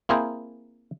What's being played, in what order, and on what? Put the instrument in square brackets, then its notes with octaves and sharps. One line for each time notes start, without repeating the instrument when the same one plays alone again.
[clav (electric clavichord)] A#3 C4 E4 G#4 A#4 C5